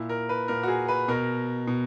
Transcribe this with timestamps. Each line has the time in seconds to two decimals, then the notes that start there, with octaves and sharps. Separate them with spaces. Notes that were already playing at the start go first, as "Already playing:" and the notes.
Already playing: A#2 E4
0.09 A#4
0.29 B4
0.48 A#2 A#4
0.63 F#4
0.68 G#4
0.88 B4
1.08 B2 A#4
1.67 B2